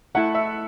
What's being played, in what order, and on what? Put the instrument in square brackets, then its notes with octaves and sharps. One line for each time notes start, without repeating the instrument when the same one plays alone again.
[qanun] A3 E4 A4 [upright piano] F#5
[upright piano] E5